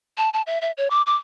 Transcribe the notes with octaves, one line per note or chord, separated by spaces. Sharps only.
A5
A5
E5
E5
C#5
D6
D6